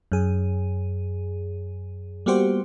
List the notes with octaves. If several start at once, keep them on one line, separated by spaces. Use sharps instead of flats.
F#2 G#4
G3 A#3 B3 F#4 G4 C5